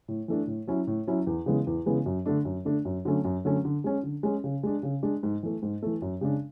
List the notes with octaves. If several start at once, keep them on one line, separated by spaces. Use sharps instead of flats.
A2
E3 A3 D4
A2
F#3 C#4 E4
A2
F#3 C#4 E4
E2
C#3 E3 G#3 B3
E2
C#3 E3 G#3 B3
F#2
D3 A3 D4
F#2
D3 A3 D4
F#2
D3 F#3 A3 C#4
F#2
D3 F#3 A3 C#4
D3
G#3 C#4
D3
G#3 C#4
C#3
G#3 D4
C#3
G#3 D4
G#2
E3 A3
G#2
E3 A3
F#2
C#3 G#3 D4